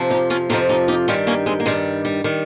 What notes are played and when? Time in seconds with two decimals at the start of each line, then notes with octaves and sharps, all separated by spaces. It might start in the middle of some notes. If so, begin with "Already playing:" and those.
Already playing: F2 C3 F3
0.10 D#4 G4
0.30 C#4 F4
0.49 F2 C3 F3 C4 D#4
0.69 D#4 G4
0.88 D#4 G4
1.08 G2 D#3 G3 C#4 F4
1.27 A#3 C#4
1.46 G#3 C4
1.60 A#3
1.66 G2 D#3 G3 G#3
2.05 G3
2.24 D#3 G3